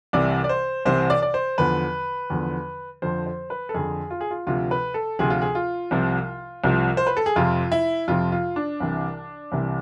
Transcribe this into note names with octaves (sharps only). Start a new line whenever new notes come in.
C2 C3 E3 D5
D5
C5
C2 C3 E3 C5
D5
D5
C5
E2 D3 F3 B4
E2 D3 F3
F2 D3 F3 C5
C5
B4
A4
F2 D3 F3 G#4
F4
G#4
F4
D2 C3 F3 F4
B4
A4
D2 C3 F3 G#4
F4
G#4
F4
C2 C3 F3
C2 C3 F3
C5
B4
A4
G#4
F2 C3 F3 F4
E4
F2 C3 F3 F4
F4
D4
C2 C3 E3
C2 C3 E3